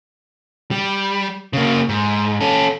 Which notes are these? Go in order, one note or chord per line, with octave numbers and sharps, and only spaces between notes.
G3
C#3 A#3
G#2
C#4 A4